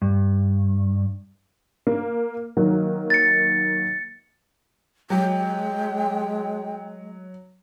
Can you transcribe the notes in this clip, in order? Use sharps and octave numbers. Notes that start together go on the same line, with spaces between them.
G2
A#3
D#3 F#3 A#3
A6 C#7
F#3 G#3 G5